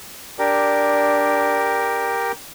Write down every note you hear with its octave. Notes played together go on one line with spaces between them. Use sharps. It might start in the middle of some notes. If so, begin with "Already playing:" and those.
D4 G4 A#4